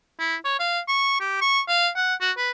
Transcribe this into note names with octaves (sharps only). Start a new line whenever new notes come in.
E4
C#5
F5
C#6
G4
C#6
F5
F#5
F#4
B4